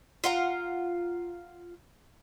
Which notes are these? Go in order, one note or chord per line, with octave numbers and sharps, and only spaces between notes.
F4 F#5 A#5